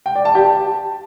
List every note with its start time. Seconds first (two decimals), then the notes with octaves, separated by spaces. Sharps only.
0.06 G5
0.15 D5
0.25 A5
0.35 G4
0.45 A5